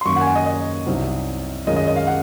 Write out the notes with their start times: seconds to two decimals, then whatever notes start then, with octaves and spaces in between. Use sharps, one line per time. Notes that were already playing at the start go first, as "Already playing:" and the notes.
0.01 C6
0.05 F#2 D#3 A#3 C#6
0.16 F#5
0.21 G#5
0.26 F#5
0.35 D#5
0.46 D#5
0.86 C2 C3 F#3 C4 D#4
1.66 F#2 D#3 G#3 C#4 F4 D#5
1.76 D#5
1.87 D#5
1.96 F5
2.07 F#5